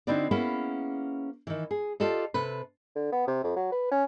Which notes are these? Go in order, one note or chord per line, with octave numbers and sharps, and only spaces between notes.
D3 C4 D#4 E4 F#4 D5
A#3 B3 C#4 E4 G#4
D#3 E3
G#4
F4 G4 A4 D5 D#5
C3 A4 B4
D3
B3
C3
F2
F#3
B4
C#4